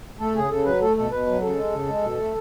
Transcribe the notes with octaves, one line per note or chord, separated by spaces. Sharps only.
A3 A4
C#3 G#4
C#3 A4
F#3 B4
A3 A4
B2 A4
B2 B4
F#3
C#3 A4
G#3
C#3
G#3
B2
A3